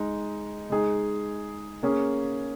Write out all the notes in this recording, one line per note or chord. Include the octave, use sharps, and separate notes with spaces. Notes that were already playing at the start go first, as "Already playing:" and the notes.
Already playing: G#3 D#4
G#3 D#4 G#4
A#3 C#4 G#4